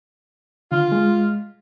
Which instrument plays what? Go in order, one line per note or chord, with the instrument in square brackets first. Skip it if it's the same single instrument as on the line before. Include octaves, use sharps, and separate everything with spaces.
[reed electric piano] D3 [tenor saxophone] F4
[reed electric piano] G#3